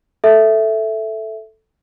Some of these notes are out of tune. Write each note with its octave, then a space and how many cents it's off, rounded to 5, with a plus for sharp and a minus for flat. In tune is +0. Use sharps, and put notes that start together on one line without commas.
A4 +0 E5 +0